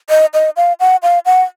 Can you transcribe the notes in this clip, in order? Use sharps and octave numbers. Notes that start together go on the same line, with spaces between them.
D#5
D#5
F5
F#5
F5
F#5